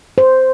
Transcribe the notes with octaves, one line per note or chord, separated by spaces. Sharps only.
C5